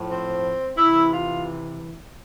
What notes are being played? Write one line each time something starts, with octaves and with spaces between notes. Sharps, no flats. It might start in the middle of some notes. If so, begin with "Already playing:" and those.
Already playing: A2 F3
C4
C3 E3 E4
F4